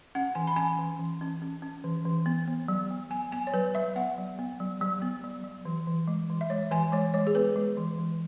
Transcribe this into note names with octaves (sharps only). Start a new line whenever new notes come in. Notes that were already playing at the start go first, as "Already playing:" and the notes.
C#4 F#5
E3 G#5
B5
C#4 G#5
E3
E3
C#4
C#4
C#4
E3
E3
B3
B3
F#3
B3
B3 G#5
B3 G#5
C#5
F#3 B4
F#3 E5
B3 F#5
F#3
B3
F#3
F#3
B3
F#3
F#3
E3
E3
G#3
E3
E5
G#3 C#5
E3 G#5
G#3 C#5
G#3 C#5
G#4
B3 B4
G#3
E3
E3